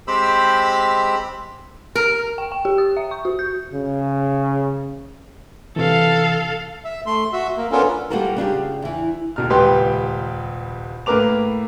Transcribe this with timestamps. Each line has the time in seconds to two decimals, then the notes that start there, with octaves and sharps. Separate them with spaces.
0.08 G#3 C4 G4 C5 B5 E6
1.95 A#4
2.38 G5
2.52 G5
2.65 G4
2.78 D#6
2.97 E5
3.11 C#6
3.25 F#4
3.39 G6
3.73 C#3
5.76 C3 E3 A4 F5
6.85 E5
7.06 A3 C6
7.33 F#4 E5
7.57 A#3
7.72 B3 C#4 D4 F4 A4 A#4
8.10 G3 A#3 F4 F#4 A4 A#4
8.36 C#3 D4 F4 G4
8.82 E2 E3
9.36 D#2 B2 F6
9.50 D#1 C#2 G4 B4 G5 C6
11.06 A2 A#3 A#4 B4 D6 F7